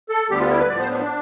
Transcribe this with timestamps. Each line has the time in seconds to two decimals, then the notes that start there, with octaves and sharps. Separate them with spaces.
0.09 A4
0.30 D2 D3 G3 B3 G4
0.40 F4
0.50 E4
0.59 B4
0.69 A2 F3 B3 D5
0.80 C5
0.90 D4
1.00 D4